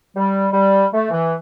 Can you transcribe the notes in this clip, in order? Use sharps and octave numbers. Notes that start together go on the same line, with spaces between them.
G3
G3
A3
E3